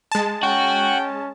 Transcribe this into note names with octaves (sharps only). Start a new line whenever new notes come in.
G#3 A5
C#4 F#4 G5